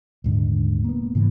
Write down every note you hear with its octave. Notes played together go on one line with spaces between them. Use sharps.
D#1 G#2 D3
A#3 B3
G#2 C#3 E3